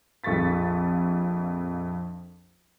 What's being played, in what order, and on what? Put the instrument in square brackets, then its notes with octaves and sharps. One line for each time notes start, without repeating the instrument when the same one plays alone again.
[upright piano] A#1 F2 A4 C#6 A6 B6